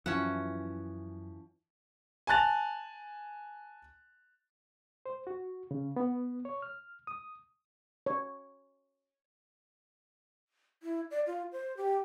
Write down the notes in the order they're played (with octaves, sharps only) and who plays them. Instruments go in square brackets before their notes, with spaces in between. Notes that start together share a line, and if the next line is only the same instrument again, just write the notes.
[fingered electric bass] F#2 [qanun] E3 F#4 B4 [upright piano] F3 [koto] C#4 F#5
[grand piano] G#5 A5 F#6 A6 F7
[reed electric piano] C5
F#4
C#3
B3
C#5
F6
D#6
[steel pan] C#5
[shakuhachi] E4
D5
F4
C5
G4